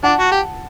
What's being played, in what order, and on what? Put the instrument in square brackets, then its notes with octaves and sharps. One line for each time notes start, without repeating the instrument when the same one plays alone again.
[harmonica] D4 [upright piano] F#5 A5
[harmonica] F#4
G4